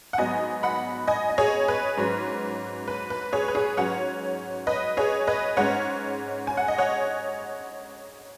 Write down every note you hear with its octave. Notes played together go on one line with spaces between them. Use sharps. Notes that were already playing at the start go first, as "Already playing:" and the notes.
F#5
G#2 F#3 B3 D#5 G#5
F#5 B5
D#5 G#5
D#5
G#4 C#5
B4
G#2 F#3 C#4
B4
B4
G#4 C#5
B4
G#4 C#5
G#2 F#3 C#4 C#5 F#5
B4 D#5
G#4 C#5
B4 D#5
G#2 G#3 C#4 C#5 F#5
G#5
F#5
D#5
C#5 F#5